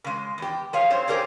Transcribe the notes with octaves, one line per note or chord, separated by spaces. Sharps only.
C#3 G#3
E2 G4
F3 A3 G#4 C#5 F5
C4 C5 C#5
G4 G#4 A#4 C5 D5